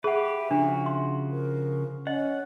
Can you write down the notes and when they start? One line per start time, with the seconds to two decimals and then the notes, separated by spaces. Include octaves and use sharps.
0.04 G4 G#4 B4 E5 F#5
0.51 C#3 F3 D4 F#4
0.86 C6
1.32 A#4
2.07 C#4 D#5 F#5